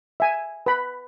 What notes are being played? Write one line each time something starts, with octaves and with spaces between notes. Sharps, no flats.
E5 G#5
B4 B5